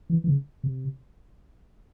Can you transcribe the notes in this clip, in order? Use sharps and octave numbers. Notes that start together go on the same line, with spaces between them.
E3
E3
C#3
C3